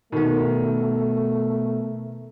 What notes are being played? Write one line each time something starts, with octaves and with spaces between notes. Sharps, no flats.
B2 D#3 A3 B3